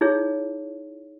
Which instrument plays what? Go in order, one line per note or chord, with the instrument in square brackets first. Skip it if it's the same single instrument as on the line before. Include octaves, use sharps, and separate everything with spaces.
[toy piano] D#4 E4 G#4 C#5